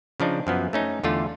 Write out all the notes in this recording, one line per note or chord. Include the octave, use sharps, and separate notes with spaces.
C#3 F3 D4 D#4
F#2 F3 B3
A3 C#4 D#4
E2 D3 A3 F4